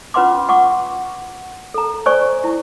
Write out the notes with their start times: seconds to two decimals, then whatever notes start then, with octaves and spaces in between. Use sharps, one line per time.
0.14 C#4 F4 B4 F#5 C6 D6
0.49 F#5 C#6 D6
1.74 A4 A#5
2.06 C5 D5 G#5 C#6
2.44 E4